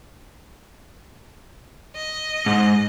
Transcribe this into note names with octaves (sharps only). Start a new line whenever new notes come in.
D#5
G#2